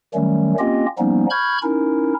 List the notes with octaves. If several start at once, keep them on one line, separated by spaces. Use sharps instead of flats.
D#3 F#3 G3 A3 C#4
A#3 C4 C#4 F4 G4 D#5
F3 G3 A#3 B3 C#4 D#4
B5 C#6 F6 G6 G#6
C#4 D#4 E4 A#4